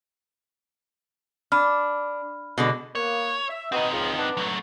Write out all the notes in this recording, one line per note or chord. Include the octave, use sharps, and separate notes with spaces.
D4 B5 F6
B2 D3 G#3
A#3 B3 C#5
E5
C4 D#4 F#4 B4 D#5
C#2 F3
B3 D4
F#3 A3